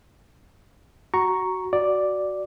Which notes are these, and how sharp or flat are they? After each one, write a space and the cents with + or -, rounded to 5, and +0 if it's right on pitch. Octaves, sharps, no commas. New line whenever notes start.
F#4 +10 A#5 +0 C#6 +0
F#4 +5 D5 +0